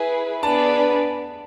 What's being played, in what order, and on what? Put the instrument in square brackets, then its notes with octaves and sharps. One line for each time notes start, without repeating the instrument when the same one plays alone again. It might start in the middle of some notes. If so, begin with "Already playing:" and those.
Already playing: [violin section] E4 G#4 B4 [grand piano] G#5
[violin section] B3 D4 G#4 B4 D5 [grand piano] A5